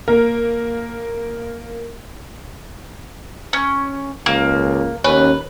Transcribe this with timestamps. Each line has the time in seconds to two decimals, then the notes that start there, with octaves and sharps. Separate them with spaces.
0.08 A#3 A#4
3.53 C#4
4.26 C#2 A#3
5.04 D#2 C#4 B4